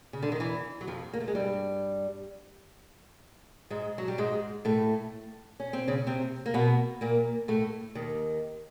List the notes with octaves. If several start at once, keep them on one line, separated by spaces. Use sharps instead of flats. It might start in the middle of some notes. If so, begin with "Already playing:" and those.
C#3
D3
D#3
E2 E3
F#3
F2 F3
A#3
A3
G#3
G2 G3
G#2 G#3
F#3
G3
G#2 G#3
A2 A3
C#4
C4
C#3 C#4
C3 C4
A#3
B2 B3
A#2 A#3
A2 A3
D#2 D#3